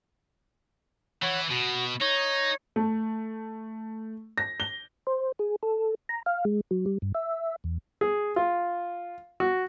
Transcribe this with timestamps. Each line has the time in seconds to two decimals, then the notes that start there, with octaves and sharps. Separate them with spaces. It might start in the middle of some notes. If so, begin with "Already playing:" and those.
1.22 E3 C#5 F#5
1.50 B2 F#4
2.01 D#4 C#5
2.76 A3
4.38 A#6
4.60 G7
5.07 C5
5.39 G#4
5.63 A4
6.09 A#5
6.26 F5
6.45 G#3
6.71 F#3
6.86 G3
7.02 G2
7.15 E5
7.64 E2
8.01 G#4
8.36 F4
9.40 F#4